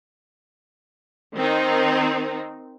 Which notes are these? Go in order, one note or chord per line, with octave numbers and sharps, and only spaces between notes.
D#3 C4 D#4